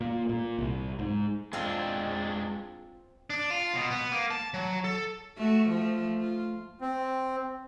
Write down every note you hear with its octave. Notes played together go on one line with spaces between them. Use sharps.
A#2
A#2
C2
G#2
G#3 C4 D4 F4
D4
F4
B2
B3
A#3
A5
F#3
A4
A3 F#4
F3 A3
F4
C4